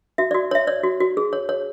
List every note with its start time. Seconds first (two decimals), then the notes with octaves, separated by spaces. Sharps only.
0.18 F#4 E5
0.31 F#4 D5
0.51 C#5 E5
0.67 C#5 D5
0.84 F#4
1.00 F#4
1.17 G#4
1.33 C#5
1.49 C#5